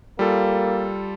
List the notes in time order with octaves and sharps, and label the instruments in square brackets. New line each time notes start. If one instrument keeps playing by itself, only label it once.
[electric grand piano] G3 F4 A4 [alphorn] A#3